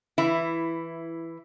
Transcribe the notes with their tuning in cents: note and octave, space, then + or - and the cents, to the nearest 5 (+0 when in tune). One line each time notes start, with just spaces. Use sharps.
E3 +0 E4 +10